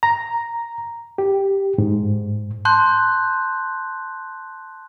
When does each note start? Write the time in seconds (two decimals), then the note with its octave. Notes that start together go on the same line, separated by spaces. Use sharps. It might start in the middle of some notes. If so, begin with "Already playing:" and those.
0.03 A#5
1.18 G4
1.78 G#2
2.65 A5 C6 F#6 G6